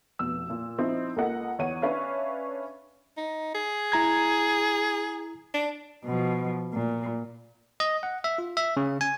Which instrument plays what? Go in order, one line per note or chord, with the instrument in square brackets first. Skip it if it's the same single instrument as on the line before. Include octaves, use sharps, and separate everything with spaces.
[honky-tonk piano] F1 B2 E6
A#2
F3 C4 D#4 E4
C#2 A#3 A4 A#4 D#5 F#5
E2 C#5 F#5 D#7
C#4 D4 B4 C#5 E5 F5
[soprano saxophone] D#4
G#4
[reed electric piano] E4 A#5 G#6
[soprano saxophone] D4
[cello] B2 F3
A#2
[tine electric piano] D#5
F#5
E5
F4
E5
C#3
G#5